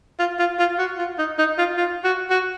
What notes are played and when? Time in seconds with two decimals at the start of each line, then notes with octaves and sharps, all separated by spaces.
0.19 F4
0.39 F4
0.59 F4
0.79 F#4
0.99 F4
1.19 D#4
1.38 D#4
1.58 F4
1.77 F4
2.04 F#4
2.30 F#4